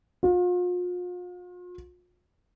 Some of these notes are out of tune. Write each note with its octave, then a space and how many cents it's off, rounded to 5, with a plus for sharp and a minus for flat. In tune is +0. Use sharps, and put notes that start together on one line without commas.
F4 +40